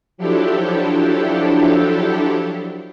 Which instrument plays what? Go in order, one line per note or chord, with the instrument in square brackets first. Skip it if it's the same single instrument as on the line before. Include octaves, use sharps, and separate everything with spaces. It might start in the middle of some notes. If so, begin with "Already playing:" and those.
[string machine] F3 F#3 D4 E4 G4 A4